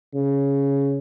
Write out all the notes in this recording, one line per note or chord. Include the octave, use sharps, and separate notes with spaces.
C#3